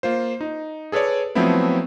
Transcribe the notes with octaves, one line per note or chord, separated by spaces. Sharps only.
A#3 F4 C5
D#4
G#4 A4 B4 C#5 D5
F3 F#3 A3 B3 C4 E4